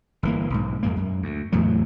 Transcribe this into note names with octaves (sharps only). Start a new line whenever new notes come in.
G1 E3 A#3
B1 G#2
F2 G#2 A#3
F#2
D2
E2 A2 C3 F#3